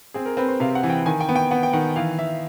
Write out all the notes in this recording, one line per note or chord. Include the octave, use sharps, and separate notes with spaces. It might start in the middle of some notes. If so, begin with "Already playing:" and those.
C4 G#4
A#4
C4 B4
C5
C3 F5
F#5
E3
G5
D#3 G#5
G5
B3
G5
B3 F#5
G5
D#3 F#5
E3 F5
E3 E5